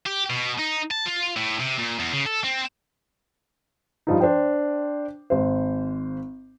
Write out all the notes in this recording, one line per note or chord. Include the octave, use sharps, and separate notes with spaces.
G4
B2
D#4
A5
F4
A2
C3
A#2
E2
C#3
A4
C4
G2 F3 D#4
D4 C5 G5
G#1 C5